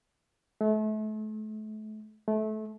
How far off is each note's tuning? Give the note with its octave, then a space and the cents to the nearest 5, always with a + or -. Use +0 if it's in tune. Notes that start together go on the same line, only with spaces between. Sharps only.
A3 -35
A3 -25